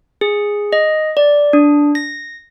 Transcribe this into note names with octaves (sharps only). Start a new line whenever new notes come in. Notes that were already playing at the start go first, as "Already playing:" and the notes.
G#4
D#5
D5
D4
A#6